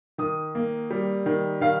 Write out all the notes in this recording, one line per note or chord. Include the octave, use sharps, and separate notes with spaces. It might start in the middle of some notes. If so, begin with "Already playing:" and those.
D#3 D#6
A#3
G3
D#3
D#3 F5